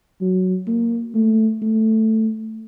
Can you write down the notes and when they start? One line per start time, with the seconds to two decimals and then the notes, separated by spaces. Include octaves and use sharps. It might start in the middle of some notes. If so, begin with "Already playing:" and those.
0.21 F#3
0.67 A#3
1.15 A3
1.62 A3